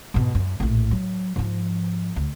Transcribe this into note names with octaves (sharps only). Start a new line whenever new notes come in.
G#2 B2
F#2
A#1 A2
F#3
G#2 F3
D2